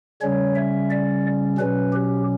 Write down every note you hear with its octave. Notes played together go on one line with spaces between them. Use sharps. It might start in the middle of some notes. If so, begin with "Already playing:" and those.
C#3 G3 C#4 C#5
E5
D5
B2 F#3 C#4 B4
G4